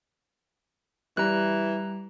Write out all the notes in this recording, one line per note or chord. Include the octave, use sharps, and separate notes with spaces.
E3 G3 A#5 F#6